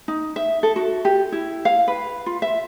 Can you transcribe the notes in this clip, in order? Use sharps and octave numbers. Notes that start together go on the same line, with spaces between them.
D#4
E5
A4
F#4
G4
E4
F5
B4
F4
E5